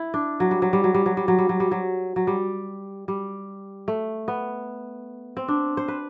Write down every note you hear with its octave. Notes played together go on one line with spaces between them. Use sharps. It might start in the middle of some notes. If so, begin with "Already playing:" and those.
Already playing: E4
D4
F#3
G3
F#3
G3
F#3
G3
F#3
G3
F#3
G3
F#3
G3
F#3
F#3
G3
G3
A3
B3
C4
D4
C5
B4